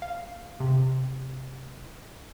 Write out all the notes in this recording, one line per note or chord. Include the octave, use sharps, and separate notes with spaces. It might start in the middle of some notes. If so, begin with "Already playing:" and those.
F5
C3